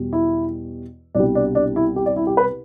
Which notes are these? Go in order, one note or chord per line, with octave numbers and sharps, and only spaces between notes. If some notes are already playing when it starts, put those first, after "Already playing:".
Already playing: E2 B2 G3
E4
C2 B2 G3 D4
D4
D4
E4
G4
D5
E4
G4
B4